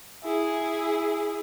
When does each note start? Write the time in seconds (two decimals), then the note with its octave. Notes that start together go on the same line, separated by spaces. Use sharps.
0.24 E4 G#4